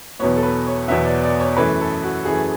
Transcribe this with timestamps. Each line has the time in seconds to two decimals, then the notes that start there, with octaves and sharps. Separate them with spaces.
0.19 E2 B2 F#3 B3 C#5
0.36 A4
0.43 B4
0.66 C#5
0.88 E2 B2 F#3 B3 E5
1.05 D5
1.23 D5
1.40 C#5
1.57 F#2 E3 A3 B4
1.80 A4
2.03 F#4
2.25 F#2 E3 A3 G#4